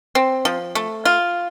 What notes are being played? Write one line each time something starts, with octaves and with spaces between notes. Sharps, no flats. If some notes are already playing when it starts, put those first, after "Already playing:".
C4
F3
A3
F4